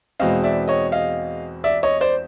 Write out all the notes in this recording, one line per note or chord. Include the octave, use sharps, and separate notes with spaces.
E2 B2 G#3 C4 D#5 F5
D5 E5
C#5 D#5
D#5 F5
D5 E5
C#5 D#5
C5 D5